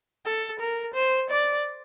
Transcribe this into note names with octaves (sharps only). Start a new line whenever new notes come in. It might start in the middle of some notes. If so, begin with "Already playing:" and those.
A4
A#4
C5
D5